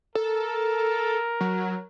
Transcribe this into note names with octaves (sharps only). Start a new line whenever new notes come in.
A4 A#4
F#3